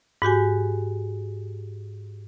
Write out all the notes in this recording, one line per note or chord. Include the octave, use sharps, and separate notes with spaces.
G#2 F#4 G4 G#5